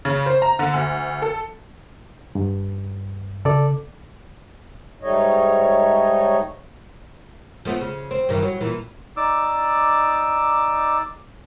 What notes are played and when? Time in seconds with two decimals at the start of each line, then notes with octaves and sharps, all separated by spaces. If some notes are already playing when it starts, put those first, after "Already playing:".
0.05 C#3
0.26 C5
0.42 A#5
0.59 D3
0.74 D2
1.22 A4
2.35 G2
3.45 C#3 A4 D5
5.02 G#2 G3 A3 D#4 C#5 D#5
7.65 F3 A3 B3
7.81 C#3
8.11 C4
8.29 G2 D#3 E3
8.42 F#3
8.61 A#2 E3
9.17 D#4 D5 D6 E6